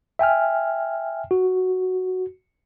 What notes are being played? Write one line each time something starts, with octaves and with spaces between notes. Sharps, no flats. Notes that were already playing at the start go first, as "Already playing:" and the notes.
E5 G5 G#5 F6
F#4